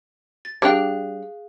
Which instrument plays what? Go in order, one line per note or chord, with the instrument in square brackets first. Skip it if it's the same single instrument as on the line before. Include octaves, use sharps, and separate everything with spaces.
[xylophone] A6
[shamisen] G3 D4 G5 [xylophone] G#4 F5 F#6